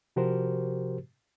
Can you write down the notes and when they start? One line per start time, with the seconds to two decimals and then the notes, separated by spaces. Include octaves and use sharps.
0.16 C3 F3 F#4 G4 A#4 C5